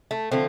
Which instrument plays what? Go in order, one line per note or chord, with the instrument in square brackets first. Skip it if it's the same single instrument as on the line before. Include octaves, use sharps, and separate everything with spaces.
[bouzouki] A3
D3 F3 A3 C4